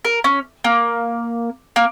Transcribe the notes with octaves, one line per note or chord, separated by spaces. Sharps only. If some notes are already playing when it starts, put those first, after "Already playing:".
A#4
C#4
A#3
A#3